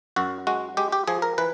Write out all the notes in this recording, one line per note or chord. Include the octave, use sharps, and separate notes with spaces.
F#2 F#4
G#3 F#4
G#3 G4
G4
F3 G#4
A#4
E3 B4